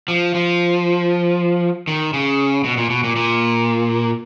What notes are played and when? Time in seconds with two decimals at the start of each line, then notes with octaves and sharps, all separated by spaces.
0.08 F3
0.35 F3
1.88 D#3
2.14 C#3
2.64 B2
2.77 A#2
2.90 B2
3.04 A#2
3.16 A#2